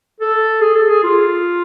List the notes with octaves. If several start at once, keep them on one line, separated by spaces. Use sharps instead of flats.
A4
G#4
A4
G#4
F4